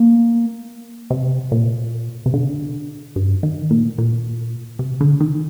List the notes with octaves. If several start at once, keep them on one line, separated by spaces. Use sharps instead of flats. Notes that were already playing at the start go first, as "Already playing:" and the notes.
Already playing: A#3
C3
A#2
C3
D3
G2
D#3
A#2
A#2
C3
D3
D#3